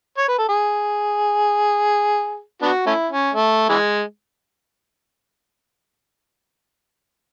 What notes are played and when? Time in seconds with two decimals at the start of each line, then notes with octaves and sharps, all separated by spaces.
0.18 C#5
0.28 B4
0.38 A4
0.48 G#4
2.62 B3 D4 F#4
2.86 A3 C#4 E4
3.10 C#4
3.34 A3
3.69 E3 G#3